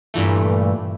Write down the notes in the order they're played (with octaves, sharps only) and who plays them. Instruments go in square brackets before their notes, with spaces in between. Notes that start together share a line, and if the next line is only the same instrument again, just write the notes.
[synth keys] G2 A#2 E3 A3